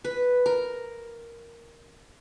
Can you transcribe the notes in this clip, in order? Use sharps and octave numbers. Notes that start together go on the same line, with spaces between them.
B4
A#4